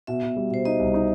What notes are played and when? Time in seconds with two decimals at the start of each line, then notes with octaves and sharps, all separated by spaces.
0.07 B2 E5
0.22 B2
0.37 G3
0.51 B2 C5
0.65 D#4 D#5
0.79 C2
0.94 D#4